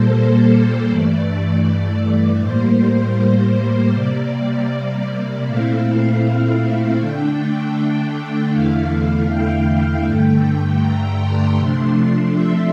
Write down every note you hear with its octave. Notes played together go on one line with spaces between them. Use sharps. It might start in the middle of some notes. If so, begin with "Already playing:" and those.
Already playing: A#2 G3 A#3 A4 C5
C5
G2 E3 A3 D5
A2 G3 A#3 C5
C3 G3 A#3 D5
A#2 A3 C4 E4 F5
F5
D3 A3 D4 G5
E2 D3 A3 E4 F5
G5
G2 D3 A3
A#5
C6
C3 F3 A3 D4
E5